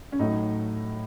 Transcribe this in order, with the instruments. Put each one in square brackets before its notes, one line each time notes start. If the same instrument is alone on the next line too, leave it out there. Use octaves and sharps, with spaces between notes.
[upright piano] C#4
[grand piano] A2 F#3 A3 [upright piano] D#4